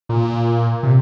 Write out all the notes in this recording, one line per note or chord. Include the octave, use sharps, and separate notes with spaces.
A#2
C3